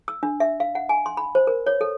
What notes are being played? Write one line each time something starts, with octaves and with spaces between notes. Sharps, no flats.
E6
D4
E5
F5
F#5
G#5
C6
B5
C5
A#4
C#5
A4